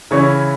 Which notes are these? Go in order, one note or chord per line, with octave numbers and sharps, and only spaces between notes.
C#3 E3 C#4 E4 C#6